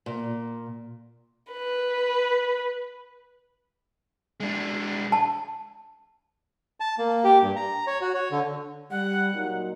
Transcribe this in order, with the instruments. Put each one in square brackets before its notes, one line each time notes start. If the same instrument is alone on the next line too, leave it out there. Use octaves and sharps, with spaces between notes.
[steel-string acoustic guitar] A#2
[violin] B4
[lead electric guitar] G#3 D4
[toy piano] A5
[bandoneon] A5
A#3
G4
G2
A#5
C#5
F#4
C#5
D3
[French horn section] G3 [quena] F#5
[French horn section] A#2 F#3 D#4